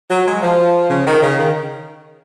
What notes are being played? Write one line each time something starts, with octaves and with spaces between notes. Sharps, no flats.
F#3
G#3
F3
C#3
D#3
C#3
D#3